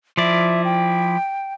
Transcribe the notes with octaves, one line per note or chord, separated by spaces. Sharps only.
F3 E4 D5 E5
G5